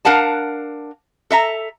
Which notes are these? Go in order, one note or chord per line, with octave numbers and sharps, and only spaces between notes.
D4 A#4 F5 F#5 A5
A4 E5 A#5